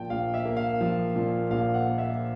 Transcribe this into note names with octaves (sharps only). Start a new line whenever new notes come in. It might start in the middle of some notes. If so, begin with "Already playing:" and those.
Already playing: A#2 F3 G5 A5
A#1 F5
E5
A#3
F5
F3
A#2
A#1 F5
F#5
A#3
E5